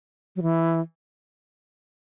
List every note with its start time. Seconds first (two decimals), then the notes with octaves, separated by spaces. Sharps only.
0.36 F#3
0.42 E3